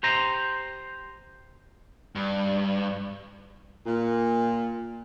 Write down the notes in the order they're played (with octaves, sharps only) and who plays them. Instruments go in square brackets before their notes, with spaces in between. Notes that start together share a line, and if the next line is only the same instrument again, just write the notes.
[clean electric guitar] G4 C5 A#5
[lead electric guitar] G2
[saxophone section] A#2